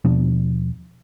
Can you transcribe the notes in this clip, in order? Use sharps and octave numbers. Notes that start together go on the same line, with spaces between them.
D#2 B2 F3 D4